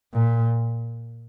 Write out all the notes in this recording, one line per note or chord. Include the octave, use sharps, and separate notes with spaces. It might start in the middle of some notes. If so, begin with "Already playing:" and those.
A#2